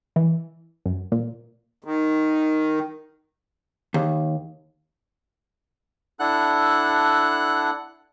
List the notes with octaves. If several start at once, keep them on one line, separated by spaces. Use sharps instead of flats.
E3
F#2
A#2
D#3
D#2
D4 E4 A4 F#5 F#6